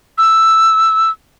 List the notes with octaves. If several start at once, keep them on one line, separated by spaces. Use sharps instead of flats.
E6